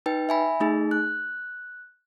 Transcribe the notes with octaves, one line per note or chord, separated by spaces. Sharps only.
D#4 B4 G5
E5 G#5 B5
A3 D#4 G#4
F#6